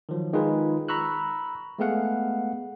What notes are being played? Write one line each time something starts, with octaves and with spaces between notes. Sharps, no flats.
D#3 F3 F#3
D#3 G#3 D#4 F4 G#4 B4
A#5 B5 C#6 E6 F#6
G#3 A3 B3 G#4 F5 F#5